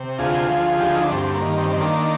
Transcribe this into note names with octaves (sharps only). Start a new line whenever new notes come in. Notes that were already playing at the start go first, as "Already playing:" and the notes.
Already playing: C3
D2 F4 G#4
F3
D2 G4
F4
D#4
D4
G2 C4
A#3
D#3
C4
D#3 C4
A#3 D4